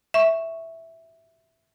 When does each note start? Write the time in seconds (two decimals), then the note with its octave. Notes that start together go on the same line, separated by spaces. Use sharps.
0.14 E5 C#6